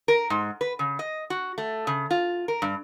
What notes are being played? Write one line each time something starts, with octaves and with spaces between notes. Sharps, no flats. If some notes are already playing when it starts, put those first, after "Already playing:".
A#4
G#2
B4
C#3
D#5
F#4
A3
C#3
F4
A#4
G2